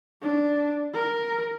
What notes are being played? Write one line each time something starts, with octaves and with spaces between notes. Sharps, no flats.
D4
A#4